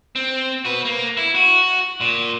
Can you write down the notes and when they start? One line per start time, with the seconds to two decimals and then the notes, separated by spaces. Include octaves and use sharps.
0.16 C4
0.65 F#4 B4
0.85 A#3
1.17 E4
1.35 F#4
2.01 A#2